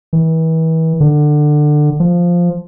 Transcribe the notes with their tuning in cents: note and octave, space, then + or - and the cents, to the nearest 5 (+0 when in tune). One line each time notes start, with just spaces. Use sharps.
E3 -35
D3 +20
F3 +0